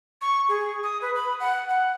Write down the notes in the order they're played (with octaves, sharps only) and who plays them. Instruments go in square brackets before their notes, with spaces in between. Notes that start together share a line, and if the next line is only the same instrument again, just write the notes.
[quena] C#6
G#4
D#6
B4
B5
F#5
F#5